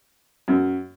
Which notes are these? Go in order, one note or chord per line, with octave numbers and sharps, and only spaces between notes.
F#2